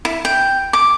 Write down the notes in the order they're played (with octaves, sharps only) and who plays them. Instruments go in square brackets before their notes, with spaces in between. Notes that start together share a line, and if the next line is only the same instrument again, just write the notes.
[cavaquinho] E4
G5
D6